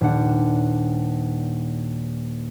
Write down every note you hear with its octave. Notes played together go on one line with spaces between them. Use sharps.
D#1 D4 F#5